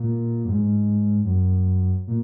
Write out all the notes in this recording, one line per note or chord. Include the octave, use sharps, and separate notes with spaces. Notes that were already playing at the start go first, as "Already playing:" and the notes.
Already playing: A#2
F#2
G#2
F#2
A#2